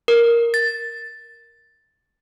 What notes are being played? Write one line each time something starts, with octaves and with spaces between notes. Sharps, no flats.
A#4
A6